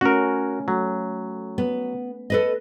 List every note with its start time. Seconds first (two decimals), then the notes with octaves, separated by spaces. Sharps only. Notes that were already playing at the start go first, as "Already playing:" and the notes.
0.01 A3 C#4 F#4 A#4
0.68 F#3 A3
1.58 B3
2.30 A4 B4 D#5